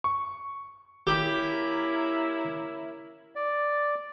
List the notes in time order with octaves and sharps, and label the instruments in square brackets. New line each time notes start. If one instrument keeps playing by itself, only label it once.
[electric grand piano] C#6
[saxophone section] A#3 C#4 E4 [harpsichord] G4
[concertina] D5